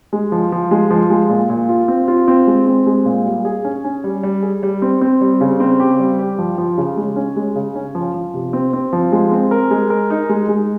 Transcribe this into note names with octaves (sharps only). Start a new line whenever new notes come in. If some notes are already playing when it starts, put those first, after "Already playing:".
G#3
F3
F3
G#3
F3
G#3
A#2
A#2
F4
C4
F4
C4
G#3
C4
G#3
A#2
G3
G#4
C#4
C#4
G3
G3
G#4
G3
C4
C4
G3
C#3
C4
G4
G3
G4
F3
F3
C#3
G#3
C#4
G#3
C#3
C#4
F3
F3
C3
C4
C4
F3
G#3
C4
A#4
G#3
A#4
D#4
G#3
G#3